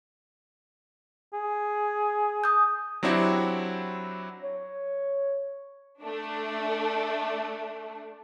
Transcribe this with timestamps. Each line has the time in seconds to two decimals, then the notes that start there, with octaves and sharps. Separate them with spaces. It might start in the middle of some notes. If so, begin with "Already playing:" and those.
1.34 G#4
2.44 D#6 G6
3.03 F#3 C4 D4 E4 F#4 G4
4.42 C#5
6.01 A3 D4